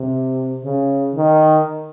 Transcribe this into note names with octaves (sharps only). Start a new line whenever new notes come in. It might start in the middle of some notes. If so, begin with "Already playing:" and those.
Already playing: C3
C#3
D#3